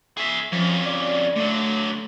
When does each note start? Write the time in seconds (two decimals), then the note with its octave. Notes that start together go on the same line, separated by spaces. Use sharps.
0.17 G#4 E5
0.52 F2 F3 C#4
0.85 D5
1.36 D3 F#3 A3